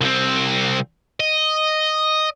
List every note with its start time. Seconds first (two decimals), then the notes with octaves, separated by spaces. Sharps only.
0.01 C2 C4
1.20 D#5